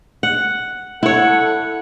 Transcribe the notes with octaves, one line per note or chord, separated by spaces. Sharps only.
F#5
E4 A4 C#5 F#5